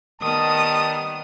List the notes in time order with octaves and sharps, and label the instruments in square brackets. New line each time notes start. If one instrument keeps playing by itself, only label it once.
[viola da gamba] D#3 B3 [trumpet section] G3 A5 [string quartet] D#6